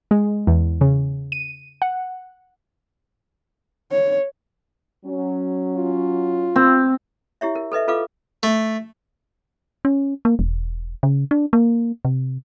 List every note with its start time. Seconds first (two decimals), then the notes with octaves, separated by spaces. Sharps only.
0.11 G#3
0.47 E2
0.81 C#3
1.32 D#7
1.82 F#5
3.92 C#5
5.05 F#3 C#4
5.76 F4
6.56 C4
7.41 E4 G4 C#5 E5
7.55 A#4
7.72 A4 B4 D#5 E5
7.88 F4 A4 B4 F5 D6
8.43 A3
9.85 C#4
10.25 A#3
10.39 E1
11.03 C#3
11.31 D4
11.53 A#3
12.05 C3